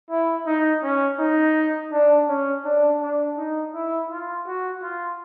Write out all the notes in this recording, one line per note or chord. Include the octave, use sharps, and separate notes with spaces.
E4
D#4
C#4
D#4
D4
C#4
D4
D4
D#4
E4
F4
F#4
F4